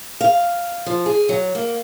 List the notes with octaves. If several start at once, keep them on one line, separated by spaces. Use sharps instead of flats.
F5
F3
G#4
F#3
A#3